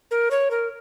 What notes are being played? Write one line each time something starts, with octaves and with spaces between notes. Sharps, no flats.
A#4
C#5
A#4